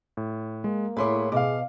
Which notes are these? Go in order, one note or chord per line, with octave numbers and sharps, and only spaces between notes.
A2
G#3 A#3
A2 E4 G#4 C#5 B5 C6 D6
B2 G#4 F5 D6